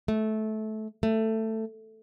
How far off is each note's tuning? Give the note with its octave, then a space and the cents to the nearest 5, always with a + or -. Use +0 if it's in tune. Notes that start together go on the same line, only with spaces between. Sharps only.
A3 -20
A3 +10